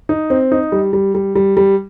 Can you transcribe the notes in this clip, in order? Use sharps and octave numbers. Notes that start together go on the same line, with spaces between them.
D#4
C4
D#4
G3
G3
G3
G3
G3